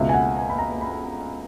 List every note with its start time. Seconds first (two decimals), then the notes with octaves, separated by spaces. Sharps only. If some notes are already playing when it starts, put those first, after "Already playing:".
Already playing: C#2 B2 E5
0.09 G#5
0.14 F#5
0.37 G#5
0.49 B5
0.58 A#5
0.81 B5